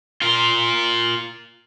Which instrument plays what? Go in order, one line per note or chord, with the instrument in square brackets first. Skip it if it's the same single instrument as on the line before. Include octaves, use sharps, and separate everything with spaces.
[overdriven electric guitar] F4 A#4